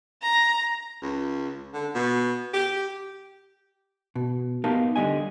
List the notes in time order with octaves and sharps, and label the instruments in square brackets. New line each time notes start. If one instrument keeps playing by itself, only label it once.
[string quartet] A#5
[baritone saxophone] C#2
D3
B2
G4
[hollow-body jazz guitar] B2
B3 D#4 G4 A#4 F5 A5
D3 G3 D#5 G#5